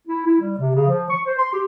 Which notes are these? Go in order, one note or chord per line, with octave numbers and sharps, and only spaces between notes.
E4
E4
G3
C3
C#3
F3
C#6
C5
C6
G4